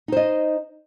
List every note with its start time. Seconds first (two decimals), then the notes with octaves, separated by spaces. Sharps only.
0.08 D#4
0.12 C5
0.17 D#5